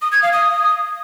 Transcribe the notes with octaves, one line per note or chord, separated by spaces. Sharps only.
D#6
G#6
F5
D#6